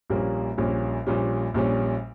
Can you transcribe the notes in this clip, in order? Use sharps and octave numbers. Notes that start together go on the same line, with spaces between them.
A#1 A#2 G3 A#3 C#4
A#1 A#2 G3 A#3 C#4
A#1 A#2 G3 C#4
A#1 A#2 G3 C#4